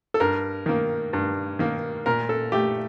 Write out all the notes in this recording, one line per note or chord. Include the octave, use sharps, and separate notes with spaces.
A4
G2 A#4
D#3 A#3
G2
D#3 A#3
A#2 A#4
A4
A3 G4